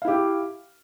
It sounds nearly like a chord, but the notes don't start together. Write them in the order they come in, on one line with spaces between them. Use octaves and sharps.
F5 E4 G4